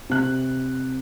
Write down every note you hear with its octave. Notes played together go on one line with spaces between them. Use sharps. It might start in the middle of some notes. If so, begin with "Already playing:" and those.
C3 F#6